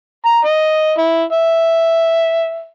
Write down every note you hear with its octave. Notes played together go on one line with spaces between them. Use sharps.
A#5
D#5
E4
E5